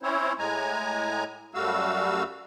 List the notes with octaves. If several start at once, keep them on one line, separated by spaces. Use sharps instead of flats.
C4 C#4 E4 C5 C#5
A2 G#3 G#5 A#5
F#2 G3 A3 F#4 F5 E6